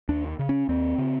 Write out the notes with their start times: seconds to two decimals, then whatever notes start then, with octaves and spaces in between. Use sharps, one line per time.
0.09 D#2 D4
0.39 C#3
0.49 C#4
0.69 D#2 C4
0.98 C#3